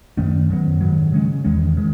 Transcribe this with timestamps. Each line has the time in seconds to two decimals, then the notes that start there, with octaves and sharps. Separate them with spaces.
0.17 F#2 D#3 A3 C#4
0.49 F#2 D#3 F#3 B3
0.81 G#2 D#3 F#3
1.12 C#3 G#3 C#4
1.44 E2 D#3 G#3 C#4
1.77 D#3 G#3